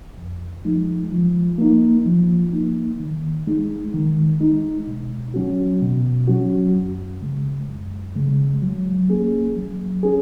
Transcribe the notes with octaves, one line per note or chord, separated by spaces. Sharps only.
F2
F3 G#3 D#4
F3
A#3 D#4
F3
A#3 D#4
D#3
G#3 D#4
D#3
G#3 D#4
B2
F#3 C#4 F#4
B2
F#3 C#4 F#4
F#2
C#3 G#3
F#2
C#3 G#3
F#3
A#3 C#4 G#4
F#3
C#4 G#4